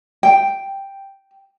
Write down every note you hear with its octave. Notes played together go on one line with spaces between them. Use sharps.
G5